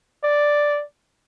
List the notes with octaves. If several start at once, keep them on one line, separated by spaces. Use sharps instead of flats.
D5